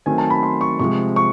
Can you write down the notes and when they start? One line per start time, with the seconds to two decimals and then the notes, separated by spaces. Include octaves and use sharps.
0.06 D#3 F#3 A3 C4 G#5
0.18 A5
0.30 B5
0.43 C6
0.61 C#6
0.79 C3 F3 G#3 C#6
1.16 C#6